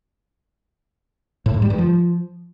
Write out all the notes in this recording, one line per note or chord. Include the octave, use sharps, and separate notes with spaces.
A2
G#2
G3
G2
F3